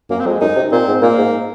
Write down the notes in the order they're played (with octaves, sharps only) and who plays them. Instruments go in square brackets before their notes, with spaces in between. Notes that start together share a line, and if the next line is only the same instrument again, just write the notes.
[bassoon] F#2 [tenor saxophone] A#3
[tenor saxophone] C4
[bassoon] F2 [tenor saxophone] F#3
[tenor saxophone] G#3
[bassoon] F#2 [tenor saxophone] D#4
[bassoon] C3
[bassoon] A#2 [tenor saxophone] C4
[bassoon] G#2
[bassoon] A#2 [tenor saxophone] A#3
[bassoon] G#2